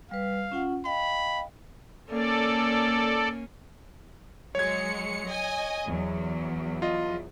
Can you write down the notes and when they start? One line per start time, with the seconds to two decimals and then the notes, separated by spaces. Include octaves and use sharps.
0.11 G3 B4 F5
0.52 C#4 F4 F#5
0.85 D#5 F5 G5 B5
2.10 A#3 C#4 A4 D5
4.55 F#3 G#3 C#5 G#6 C#7
5.29 D#5 G#5
5.87 E2 F#3
6.82 F4 D#5